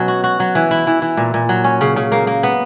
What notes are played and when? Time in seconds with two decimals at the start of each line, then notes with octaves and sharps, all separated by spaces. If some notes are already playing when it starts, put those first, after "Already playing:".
Already playing: B2 F#3 C#4
0.08 F#4
0.24 F#4
0.40 F#3
0.55 E3
0.71 E4
0.87 E3
1.02 E3
1.17 A#2
1.34 A#2
1.49 F#3
1.64 C#4
1.81 C#3
1.96 C#3
2.12 A#3
2.27 A#3
2.43 B3